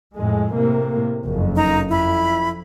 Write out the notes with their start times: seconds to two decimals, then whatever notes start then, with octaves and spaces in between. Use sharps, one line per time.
0.15 F2 A2 G#3
0.53 A2 C3 A#3
1.24 F#1 F2
1.56 D#4 A#5
1.90 F2 E4 B5